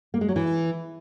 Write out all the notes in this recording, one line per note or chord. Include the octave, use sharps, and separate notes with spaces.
A#3
G#3
F#3
E3